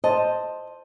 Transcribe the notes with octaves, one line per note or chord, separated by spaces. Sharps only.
C5 D#5 A5